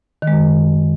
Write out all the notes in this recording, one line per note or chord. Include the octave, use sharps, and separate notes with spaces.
D#3
G#3
F#2